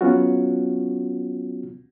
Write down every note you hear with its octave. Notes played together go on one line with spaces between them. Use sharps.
F#3 B3 C#4 F4 F#4